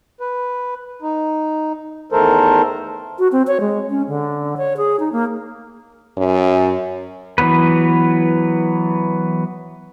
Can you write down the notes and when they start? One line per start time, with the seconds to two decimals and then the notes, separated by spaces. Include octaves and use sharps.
0.20 B4
1.02 D#4
2.12 E2 D#3 A3 A4 A#4 C5
3.19 F#4
3.32 C4
3.47 C#5
3.61 G#3
3.90 C#4
4.08 D3
4.57 C#5
4.77 G#4
5.00 D#4
5.12 A#3
6.17 F#2
7.38 E3 F#3 B3 B4